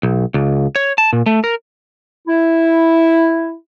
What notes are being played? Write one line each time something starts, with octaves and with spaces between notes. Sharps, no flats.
B1
C#2
C#5
A5
A#2
A3
A#4
E4